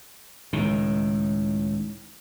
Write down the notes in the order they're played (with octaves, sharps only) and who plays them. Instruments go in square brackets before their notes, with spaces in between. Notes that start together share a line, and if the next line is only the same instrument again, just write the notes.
[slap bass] C#2 A2 D#3